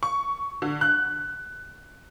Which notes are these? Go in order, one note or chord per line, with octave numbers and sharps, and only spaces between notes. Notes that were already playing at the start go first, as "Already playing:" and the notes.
C#6
D3
F#6